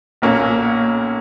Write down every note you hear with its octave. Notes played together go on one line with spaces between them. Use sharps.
B1 A#2 A#3 C#4